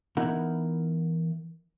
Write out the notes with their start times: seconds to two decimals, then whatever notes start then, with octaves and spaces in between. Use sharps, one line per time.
0.17 E3 B3 D#4 E4 A#4 F#5